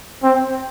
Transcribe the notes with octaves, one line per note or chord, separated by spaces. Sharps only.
C4